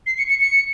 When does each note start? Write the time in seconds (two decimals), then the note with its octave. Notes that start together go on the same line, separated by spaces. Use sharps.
0.06 C7
0.18 C#7
0.30 C#7
0.41 C#7